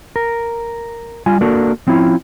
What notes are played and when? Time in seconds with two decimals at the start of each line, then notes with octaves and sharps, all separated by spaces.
0.16 A#4
1.26 G3 F4 G#5
1.41 A#3 D4 F#4 A4 A#4
1.87 F3 C4 C#4 E4 F4